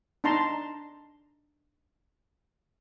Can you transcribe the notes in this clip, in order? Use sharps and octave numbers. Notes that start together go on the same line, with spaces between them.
D4 D#4 A5 A#5 C6